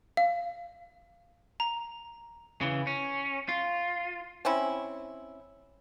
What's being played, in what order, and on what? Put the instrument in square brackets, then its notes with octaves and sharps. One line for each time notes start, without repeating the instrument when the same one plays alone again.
[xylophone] F5
A#5
[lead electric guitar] C#3 E3
C#4
F4
[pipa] C4 C#4 E4